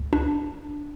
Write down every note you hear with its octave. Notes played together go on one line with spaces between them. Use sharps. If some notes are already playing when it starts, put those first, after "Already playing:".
Already playing: C#2
D4